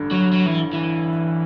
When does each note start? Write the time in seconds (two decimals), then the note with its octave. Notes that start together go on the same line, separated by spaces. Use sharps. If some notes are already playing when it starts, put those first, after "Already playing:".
Already playing: A1 G2 D3
0.11 F#3
0.32 F#3
0.46 E3
0.73 E3